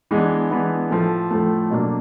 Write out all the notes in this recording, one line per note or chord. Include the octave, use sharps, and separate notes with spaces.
E3 G#3 B3 D4
E3 G#3 B3 D4
A2 F3 A3
A2 F3 A3
B2 F#3 A#3 D4